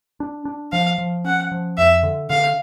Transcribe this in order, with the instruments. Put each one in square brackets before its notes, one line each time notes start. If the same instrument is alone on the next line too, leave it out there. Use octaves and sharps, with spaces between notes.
[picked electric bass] D4
D4
[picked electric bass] F3 [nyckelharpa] F5
[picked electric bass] F3
[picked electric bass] C#4 [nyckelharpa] F#5
[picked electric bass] F3
[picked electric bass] F2 [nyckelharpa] E5
[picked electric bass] D3
[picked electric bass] D3 [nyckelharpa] F5